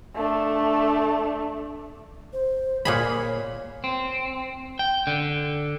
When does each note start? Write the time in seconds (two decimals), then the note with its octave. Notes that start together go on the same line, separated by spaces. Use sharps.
0.15 A3 D4
2.33 C5
2.85 A#2 G#4 C#5 B5
3.84 C4
4.79 G5
5.07 D3